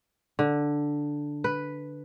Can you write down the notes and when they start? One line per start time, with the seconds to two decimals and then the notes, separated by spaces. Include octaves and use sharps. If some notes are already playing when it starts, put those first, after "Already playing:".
0.39 D3
1.44 B4